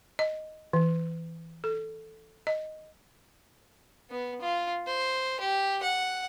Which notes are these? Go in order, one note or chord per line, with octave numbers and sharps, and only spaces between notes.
D#5
E3
A4
D#5
B3
F4
C5
G4
F#5